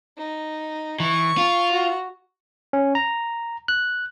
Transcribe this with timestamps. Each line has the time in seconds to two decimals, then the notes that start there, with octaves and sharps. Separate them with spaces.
0.17 D#4
1.00 E3 C#6
1.38 F4
1.72 F#4
2.73 C#4
2.95 A#5
3.68 F#6